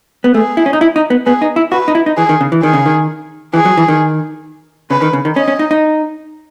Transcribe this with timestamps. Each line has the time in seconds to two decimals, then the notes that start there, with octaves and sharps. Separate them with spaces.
0.24 B3
0.34 A3 G#4
0.57 E4
0.66 C#4
0.73 D#4
0.81 E4
0.96 D#4
1.10 B3
1.26 B3 G#4
1.42 D#4
1.56 E4
1.72 F#4 B4
1.88 D#4
1.95 E4
2.06 D#4
2.17 E3 G#4
2.29 D#3
2.41 C#3
2.52 E3
2.62 D#3 G#4
2.73 C#3
2.86 D#3
3.54 E3 G#4
3.65 F#3
3.77 E3
3.88 D#3
4.90 C#3 B4
5.02 D#3
5.13 C#3
5.25 D#3
5.36 C#4 D#5
5.48 C#4
5.59 D#4
5.71 D#4